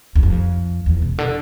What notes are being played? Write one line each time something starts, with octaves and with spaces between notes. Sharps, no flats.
E2
F2
E2
B2
D3